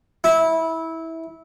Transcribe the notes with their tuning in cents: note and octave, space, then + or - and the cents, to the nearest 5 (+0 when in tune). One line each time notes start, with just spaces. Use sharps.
E4 -20